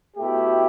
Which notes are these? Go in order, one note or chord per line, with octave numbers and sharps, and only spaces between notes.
B2 A3 E4 G4